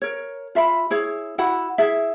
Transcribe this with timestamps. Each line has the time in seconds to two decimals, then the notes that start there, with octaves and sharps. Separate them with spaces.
0.02 A#4 C#5
0.55 F4 E5 B5
0.90 E4 G#4 C#5
1.38 E4 F#4 F#5 B5
1.78 E4 G#4 E5